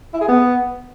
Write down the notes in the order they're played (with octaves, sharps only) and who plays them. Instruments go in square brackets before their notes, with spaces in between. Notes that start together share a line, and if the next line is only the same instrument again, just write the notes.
[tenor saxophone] E4
G#4
B3